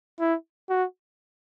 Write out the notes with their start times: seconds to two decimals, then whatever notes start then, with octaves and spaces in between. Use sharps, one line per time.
0.19 E4
0.69 F#4